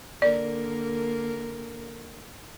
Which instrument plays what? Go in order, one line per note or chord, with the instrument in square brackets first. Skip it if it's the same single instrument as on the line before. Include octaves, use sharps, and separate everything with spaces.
[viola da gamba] D3 A#3 A#4 [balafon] D5